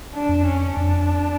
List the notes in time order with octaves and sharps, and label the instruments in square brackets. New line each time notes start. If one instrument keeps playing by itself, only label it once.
[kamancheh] D4
[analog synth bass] F2
[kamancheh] C#4
[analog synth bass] F2 [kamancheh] D4